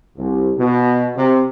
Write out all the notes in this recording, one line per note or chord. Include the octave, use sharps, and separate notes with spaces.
C2
B2
C3